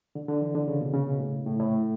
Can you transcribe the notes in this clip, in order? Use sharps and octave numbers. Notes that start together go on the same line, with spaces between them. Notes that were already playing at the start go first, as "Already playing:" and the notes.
D3
D3
E3
D3
C#3
B2
C#3
B2
A2
A2
A2